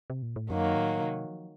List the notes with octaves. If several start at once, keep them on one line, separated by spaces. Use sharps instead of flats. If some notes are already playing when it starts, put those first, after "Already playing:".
C3
A#2
A2
F#2 D#3 F#3 A#3
A2
C3
F3